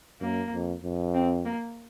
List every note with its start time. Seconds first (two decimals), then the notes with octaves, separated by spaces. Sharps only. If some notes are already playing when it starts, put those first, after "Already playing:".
0.21 F#2 A#3
0.53 F2
0.83 F2
1.14 C4
1.45 A#3